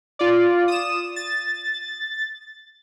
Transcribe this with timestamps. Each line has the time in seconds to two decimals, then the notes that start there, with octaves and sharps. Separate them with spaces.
0.19 F4 D5
0.68 D#6 E7
1.16 A6